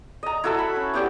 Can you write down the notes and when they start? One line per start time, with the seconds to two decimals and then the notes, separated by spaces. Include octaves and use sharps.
0.23 D#5 A#5
0.44 E4 F#4 A4 E5
0.59 B5
0.76 C#4
0.94 B3 E4 G4 D5